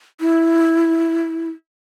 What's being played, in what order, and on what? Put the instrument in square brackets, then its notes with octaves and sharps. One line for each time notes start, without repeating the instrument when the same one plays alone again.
[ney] E4